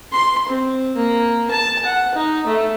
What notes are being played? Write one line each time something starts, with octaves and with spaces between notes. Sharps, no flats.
C6
C4
A#3
A5
F#5
D#4
A3